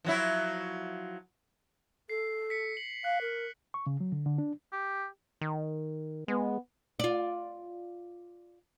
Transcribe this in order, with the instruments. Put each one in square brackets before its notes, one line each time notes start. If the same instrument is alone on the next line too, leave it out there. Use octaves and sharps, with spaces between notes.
[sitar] F3 F#3 E4
[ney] A4 [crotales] C7
[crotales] B6 C#7
F#7
[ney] F5 [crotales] F#6
[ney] A#4
[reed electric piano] C#6
C#3
F#3
D3
D3
D4
[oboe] G4
[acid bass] D#3
[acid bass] G#3 [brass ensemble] B3
[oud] F4 D5